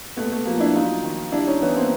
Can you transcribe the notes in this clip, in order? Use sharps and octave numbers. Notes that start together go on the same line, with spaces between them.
A#2 A3 B3
A3
F3 A#3
D4 E4
F#3 D#4 F4
D#3
G3 D4 E4
C#4 D#4
E3 B3 C#4
A#3 C4